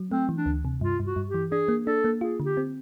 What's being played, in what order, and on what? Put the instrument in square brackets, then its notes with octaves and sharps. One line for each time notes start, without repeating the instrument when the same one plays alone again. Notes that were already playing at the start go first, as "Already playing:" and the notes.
Already playing: [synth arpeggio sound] F#3
[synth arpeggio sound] A3 [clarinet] C4
[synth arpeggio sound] E3
[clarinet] D4
[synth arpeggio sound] D2
C3
[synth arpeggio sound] G2 [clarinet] F4
[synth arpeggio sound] G2
[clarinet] F#4
[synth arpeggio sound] G2
[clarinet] G4
[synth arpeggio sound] E3
[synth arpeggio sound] D4 [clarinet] G#4
[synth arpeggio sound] A#3
[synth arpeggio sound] D4 [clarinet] A4
[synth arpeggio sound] A#3
[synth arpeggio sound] F4 [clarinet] G#4
[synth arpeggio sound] D3
[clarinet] G4
[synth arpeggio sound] C4